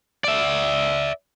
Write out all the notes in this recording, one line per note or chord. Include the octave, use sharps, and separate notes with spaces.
D5 E5